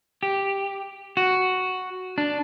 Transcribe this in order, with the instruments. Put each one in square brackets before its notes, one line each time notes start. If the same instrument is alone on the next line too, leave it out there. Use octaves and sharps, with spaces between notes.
[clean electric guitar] G4
F#4
D4